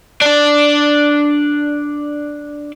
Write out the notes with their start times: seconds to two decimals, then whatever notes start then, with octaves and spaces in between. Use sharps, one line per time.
0.22 D4 D5